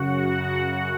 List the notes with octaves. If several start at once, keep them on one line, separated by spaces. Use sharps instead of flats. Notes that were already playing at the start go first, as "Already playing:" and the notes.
Already playing: F#2 C#3 F#4 F#5